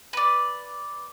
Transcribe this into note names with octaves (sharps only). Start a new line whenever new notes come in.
B4 D5